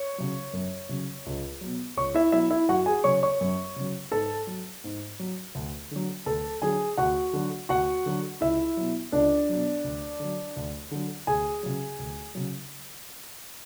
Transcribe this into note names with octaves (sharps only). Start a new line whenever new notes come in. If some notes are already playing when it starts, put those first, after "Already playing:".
Already playing: C#5 C#6
C#3 F#3
F#2
C#3 F#3
C#2
B2 F#3
C#2 C#5 C#6
E4 E5
B2 F#3 E4 E5
E4 E5
F#2 F#4 F#5
G#4 G#5
C#3 F#3 C#5 C#6
C#5 C#6
F#2
C#3 F#3
G#2 A4 A5
F#3
G#2
F#3
D2
D3 F#3
D2 A4 A5
D3 F#3 G#4 G#5
D2 F#4 F#5
D3 F#3
D2 F#4 F#5
D3 F#3
C#2 E4 E5
B2 F#3
C#2 D4 D5
B2 F#3
D2
D3 F#3
D2
D3 F#3
D2 G#4 G#5
C#3 F#3
D2
C#3 F#3